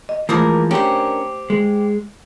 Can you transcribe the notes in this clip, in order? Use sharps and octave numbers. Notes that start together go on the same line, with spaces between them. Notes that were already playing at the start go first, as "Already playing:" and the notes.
D#5
E3 F3 G#3 A3 A#4 D6 D#6
C#4 D4 G4 A#4 C5
G#3